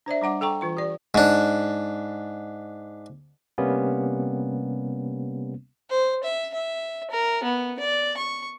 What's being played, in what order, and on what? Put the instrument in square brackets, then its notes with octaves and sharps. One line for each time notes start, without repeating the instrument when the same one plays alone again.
[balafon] D4 C5 D5 E5
G3 D4 F#5 D6
A4 G5 A#5 C#6
E3 F4 C#6
G4 D5
[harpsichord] G#2 D4
[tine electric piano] C3 G3 A#3 B3 C#4
[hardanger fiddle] C5
E5
E5
A#4
B3
D5
C#6